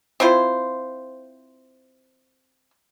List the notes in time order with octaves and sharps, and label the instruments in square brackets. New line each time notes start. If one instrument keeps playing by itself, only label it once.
[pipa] C4 E4 F4 C5